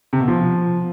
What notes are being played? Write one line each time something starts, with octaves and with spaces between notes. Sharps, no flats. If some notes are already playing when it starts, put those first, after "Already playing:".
C3
B2
F3